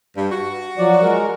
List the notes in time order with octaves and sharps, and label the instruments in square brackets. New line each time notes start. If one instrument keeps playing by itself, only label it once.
[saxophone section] G2
F#4
[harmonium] F3 F#3 D5
G#3 A#4